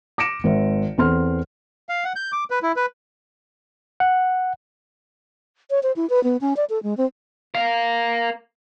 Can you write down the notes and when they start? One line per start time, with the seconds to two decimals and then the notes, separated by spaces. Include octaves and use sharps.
0.18 D6 A#6 C#7 D7 E7
0.44 G#1 C5 E5
0.98 E2 C4 A4 C6 F6
1.89 F5
2.04 F#5
2.16 G6
2.32 D6
2.50 B4
2.63 E4
2.76 B4
4.00 F#5
5.70 C#5
5.83 C5
5.96 E4
6.10 B4
6.24 B3
6.41 C#4
6.57 D5
6.70 A4
6.83 G#3
6.97 C4
7.55 A#4 F5